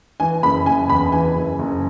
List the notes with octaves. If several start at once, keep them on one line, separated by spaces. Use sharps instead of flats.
E3 G#5
F#1 B5
F#1 G#5
E2 B5
E3 G#5
F#1
F#1